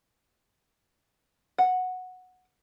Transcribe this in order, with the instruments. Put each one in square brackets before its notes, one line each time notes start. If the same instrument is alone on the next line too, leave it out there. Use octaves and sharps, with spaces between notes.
[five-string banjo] F#5